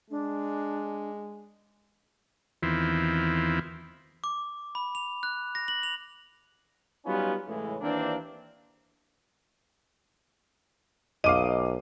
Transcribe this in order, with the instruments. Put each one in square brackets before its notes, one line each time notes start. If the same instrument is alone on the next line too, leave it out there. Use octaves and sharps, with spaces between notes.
[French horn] G#3 [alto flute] D4
[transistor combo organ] E2 D#3 E3 C4 E4 F4
[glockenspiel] D6
B5
F7
F#6
A#6
F#7
F7
[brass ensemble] F#3 G3 B3 C#4 D#4 F4
A2 C#3 E3 G#3
D#2 E3 A#3 C4 D4
[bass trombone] B1 [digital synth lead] D#5 [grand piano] F5 D6 D#7